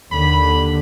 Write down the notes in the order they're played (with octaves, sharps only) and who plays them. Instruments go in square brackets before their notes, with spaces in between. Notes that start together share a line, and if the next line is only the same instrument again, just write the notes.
[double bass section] D#2 D3 [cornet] B5